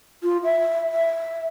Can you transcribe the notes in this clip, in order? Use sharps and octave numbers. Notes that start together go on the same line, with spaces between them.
F4
E5
E5